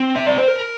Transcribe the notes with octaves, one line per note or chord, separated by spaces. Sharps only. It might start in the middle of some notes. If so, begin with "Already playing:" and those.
Already playing: C4
E5
D5
C5
A#4